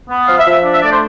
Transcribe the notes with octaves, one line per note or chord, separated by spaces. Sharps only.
B3
F3 F5
E5
F3
E5
D4
E5
A3 D5
C5